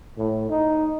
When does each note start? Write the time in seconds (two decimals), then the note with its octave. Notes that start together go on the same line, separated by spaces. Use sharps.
0.18 A2
0.49 D#4